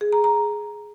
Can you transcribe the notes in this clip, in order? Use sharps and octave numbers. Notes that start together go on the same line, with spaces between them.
G#4
A#5
A#5